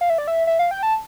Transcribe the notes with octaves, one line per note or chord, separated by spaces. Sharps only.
F5
E5
D5
E5
E5
F5
G5
A5